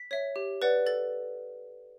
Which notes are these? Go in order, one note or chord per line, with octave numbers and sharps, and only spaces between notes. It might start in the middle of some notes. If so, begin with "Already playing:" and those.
Already playing: B6
C#5 E5
G4
B4 D5 F#5
A4 A6